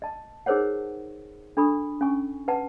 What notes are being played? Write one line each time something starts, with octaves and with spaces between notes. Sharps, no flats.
D#5 A5
D#4 G#4 A#4 C5 C#5 F#5
D4 A4 B5 C#6 D#6
C#4 G#5 C#6
B4 F#5 A5 A#5